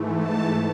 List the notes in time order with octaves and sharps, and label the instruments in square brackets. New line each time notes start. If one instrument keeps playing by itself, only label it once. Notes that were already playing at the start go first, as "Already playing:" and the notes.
Already playing: [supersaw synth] G#2 E3 A3
A5